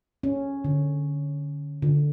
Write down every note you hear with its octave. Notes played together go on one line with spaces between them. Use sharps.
C#4
D3
D3